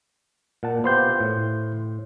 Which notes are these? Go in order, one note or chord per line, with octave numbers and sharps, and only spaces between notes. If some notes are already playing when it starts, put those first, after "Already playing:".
A#2 F#5 A5
B3 F4 G4 C5 C6 G6
A2